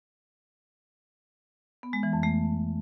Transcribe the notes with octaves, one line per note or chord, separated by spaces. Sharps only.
B3
G#3
E3
F2
A3